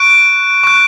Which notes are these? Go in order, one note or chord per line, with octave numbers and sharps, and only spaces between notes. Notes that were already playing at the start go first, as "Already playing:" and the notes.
Already playing: C#6 F#6 D7
C#6 F#6